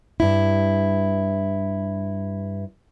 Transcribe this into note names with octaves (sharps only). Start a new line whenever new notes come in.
G2 E4